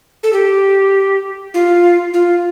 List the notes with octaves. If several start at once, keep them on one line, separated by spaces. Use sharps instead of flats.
A4
G4
F4
F4